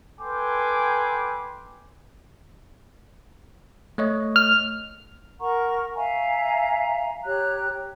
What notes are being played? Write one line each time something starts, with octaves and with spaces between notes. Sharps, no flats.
A4 B4 G5 G#5 C6 D6
A3 C#5 D#5
F6
A#4 F#5 A#5 C#6
E5 F5 G#5 A#5
G4 C#5 A#5 F#6